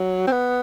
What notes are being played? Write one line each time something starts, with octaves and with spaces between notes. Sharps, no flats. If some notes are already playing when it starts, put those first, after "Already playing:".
Already playing: F#3
C4
B3